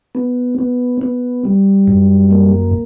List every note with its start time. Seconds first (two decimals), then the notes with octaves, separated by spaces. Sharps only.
0.15 B3
0.59 B3
1.01 B3
1.45 G3
1.88 F#2
2.31 A#3